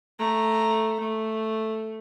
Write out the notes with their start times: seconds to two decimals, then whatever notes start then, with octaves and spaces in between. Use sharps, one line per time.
0.19 A3 A#5
1.00 A3